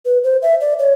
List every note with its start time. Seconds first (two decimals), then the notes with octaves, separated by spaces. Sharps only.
0.05 B4
0.24 C5
0.42 E5
0.61 D5
0.79 C#5